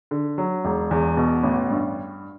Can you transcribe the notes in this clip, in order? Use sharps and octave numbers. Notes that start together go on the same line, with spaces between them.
D3
F#3
E1
E2
B2
A1
G2